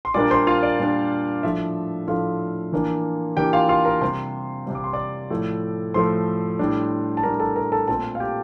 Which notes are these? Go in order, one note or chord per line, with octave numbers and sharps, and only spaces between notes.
C6
A#2 G3 A#3 D4 D5 D6
C5 C6
F4 F5
D5
A#2 G3 A#3 D4
A2 F3 A3 D4 E5
A2 F3 A3 D4 F4 F5
E3 A#3 D4
E3 A#3 D4 G4 G5
F4 F5
F4 F5
A#4 A#5
C3 G3 C4 C5 C6
C3 G3 C4
D6
C6
D5 D6
A2 F3 A3
A2 F3 A3 C5 C6
A2 G3 D4
A5
A2 G3 D4 A#4 A#5
A4 A5
A#4 A#5
A4 A5
A#2 A3 C4 A4 A5
F5
G4 G5